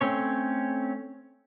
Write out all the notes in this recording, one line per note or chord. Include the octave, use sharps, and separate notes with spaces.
A3 C4 C#4 C#5